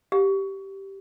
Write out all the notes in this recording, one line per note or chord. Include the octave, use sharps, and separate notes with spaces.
G4